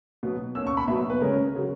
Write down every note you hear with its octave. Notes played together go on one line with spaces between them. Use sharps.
B2 F#3 B3
B2 A#3 C#4 E6
C#6
B5
B2 F#3 B3 E5
B4
C#3 G#3 C#4 A#4
C#3 F#3